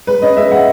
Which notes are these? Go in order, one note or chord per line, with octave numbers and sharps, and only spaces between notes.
G#3 B4
C#4 D#5
G#3 E5
G#3 F#5